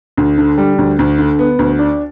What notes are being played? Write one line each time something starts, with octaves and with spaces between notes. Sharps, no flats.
D2
D3
G3
D2
D2
D3
B3
D2
D4